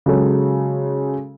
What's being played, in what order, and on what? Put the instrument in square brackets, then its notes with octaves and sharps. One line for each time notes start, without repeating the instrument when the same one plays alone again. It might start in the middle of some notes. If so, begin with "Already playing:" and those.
[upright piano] C#3 F#3 G#3 C#4 A4